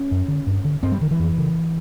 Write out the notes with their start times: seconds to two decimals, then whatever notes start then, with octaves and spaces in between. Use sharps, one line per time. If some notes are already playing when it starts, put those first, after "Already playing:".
Already playing: C#4
0.11 F#2
0.28 D3
0.47 G2
0.65 D3
0.83 G2 C4
0.92 G3
1.01 D3 D#3
1.11 E3
1.19 F2
1.38 C#3